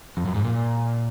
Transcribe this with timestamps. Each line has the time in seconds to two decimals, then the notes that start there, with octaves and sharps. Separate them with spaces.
0.17 F2
0.26 F#2
0.35 G#2
0.45 A#2